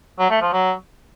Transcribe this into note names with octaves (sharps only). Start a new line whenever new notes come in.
F#3
A3
F3
F#3